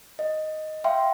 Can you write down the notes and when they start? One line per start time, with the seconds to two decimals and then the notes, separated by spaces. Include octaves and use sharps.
0.19 D#5
0.84 E5 F5 G5 C6